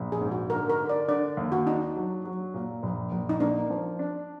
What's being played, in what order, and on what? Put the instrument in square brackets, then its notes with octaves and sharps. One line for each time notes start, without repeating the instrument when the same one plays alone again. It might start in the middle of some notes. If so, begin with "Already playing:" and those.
Already playing: [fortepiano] A#1
[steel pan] G#4
[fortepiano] G#2
[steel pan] F#4
[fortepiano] D3 [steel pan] A#4
[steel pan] A#4
[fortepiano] D3
[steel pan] D5
[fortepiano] D3 [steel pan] D5
[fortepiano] D#2
[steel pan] F#4
[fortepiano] D4 [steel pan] D#4
[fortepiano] F#3
F#3
A#2
A#1
A#1
[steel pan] D#4
[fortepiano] A#3 [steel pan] D4
[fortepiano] F3
D4